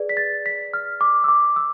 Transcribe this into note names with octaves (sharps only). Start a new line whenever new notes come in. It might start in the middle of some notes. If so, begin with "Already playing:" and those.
Already playing: G#4 B4 D5
B6
A6
B6
F6
D6
E6
D6
E6